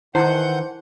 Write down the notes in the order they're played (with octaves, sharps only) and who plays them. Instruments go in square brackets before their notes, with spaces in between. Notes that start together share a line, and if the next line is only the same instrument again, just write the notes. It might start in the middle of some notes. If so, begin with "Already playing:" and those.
[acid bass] D#3 [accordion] E3 F#5 G6 [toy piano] D#4 E4 A5 [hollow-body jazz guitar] C5